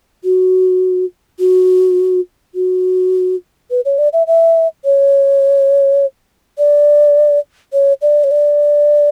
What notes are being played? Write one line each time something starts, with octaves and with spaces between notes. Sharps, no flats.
F#4
F#4
F#4
B4
C#5
D5
E5
E5
C#5
D5
C#5
D5
C#5
D5